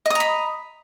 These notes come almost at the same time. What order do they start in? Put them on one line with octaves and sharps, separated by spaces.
D#5 D#6 A#5 B5